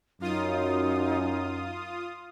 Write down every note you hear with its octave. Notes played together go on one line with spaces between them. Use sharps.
F#2 D#4 F4 D#6